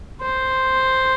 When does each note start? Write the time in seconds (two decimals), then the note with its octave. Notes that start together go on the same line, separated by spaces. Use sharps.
0.22 C5